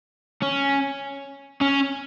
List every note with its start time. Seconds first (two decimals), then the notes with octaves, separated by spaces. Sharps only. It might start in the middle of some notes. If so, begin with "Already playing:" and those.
0.42 C#4
1.61 C#4